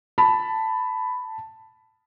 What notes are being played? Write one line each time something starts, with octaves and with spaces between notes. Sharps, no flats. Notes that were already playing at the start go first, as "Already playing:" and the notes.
A5 B5